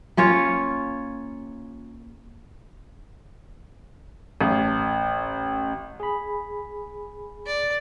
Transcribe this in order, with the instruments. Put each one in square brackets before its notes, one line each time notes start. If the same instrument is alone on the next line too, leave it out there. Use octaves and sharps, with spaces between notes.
[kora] A#3 C#4 F4 C#5
[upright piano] A1
[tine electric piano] G#4 B5
[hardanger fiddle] D5